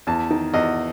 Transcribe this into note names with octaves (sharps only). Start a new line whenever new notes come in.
E2 A5
D#3
E2 D#5